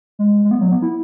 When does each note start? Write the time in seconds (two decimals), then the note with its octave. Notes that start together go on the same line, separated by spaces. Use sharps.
0.19 G#3
0.45 G#3
0.51 B3
0.61 F#3
0.71 B3
0.82 E4